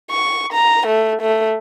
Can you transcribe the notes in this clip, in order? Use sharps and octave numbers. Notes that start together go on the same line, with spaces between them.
C#6
A#5
A3
A3